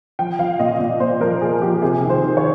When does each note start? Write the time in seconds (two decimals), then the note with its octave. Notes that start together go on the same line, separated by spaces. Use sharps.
0.19 F3 G5
0.39 F3 F5
0.59 A#2 D#5
0.80 A#2
1.00 A#2 C5
1.21 F3 A#4
1.41 A#2 G#4
1.62 F3 G4
1.82 C3 G#4
2.03 D#3
2.10 C5
2.23 D#3
2.37 C#5